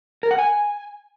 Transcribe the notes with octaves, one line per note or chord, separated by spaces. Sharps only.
A#4
F#5
G#5